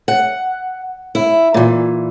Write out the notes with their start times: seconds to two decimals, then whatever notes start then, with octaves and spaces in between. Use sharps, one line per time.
0.08 F#5
1.15 E4
1.54 A#2 E3